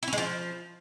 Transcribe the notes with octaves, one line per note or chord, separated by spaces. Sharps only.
E4
C#4
G#3
F3